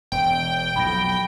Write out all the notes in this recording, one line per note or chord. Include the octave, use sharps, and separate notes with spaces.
E1 G5
B1 F2 B5 A#6